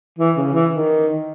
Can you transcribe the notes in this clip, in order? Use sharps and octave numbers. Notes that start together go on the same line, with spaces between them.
E3
C#3
E3
D#3